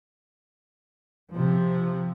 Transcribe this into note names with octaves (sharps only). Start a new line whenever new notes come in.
C3 F3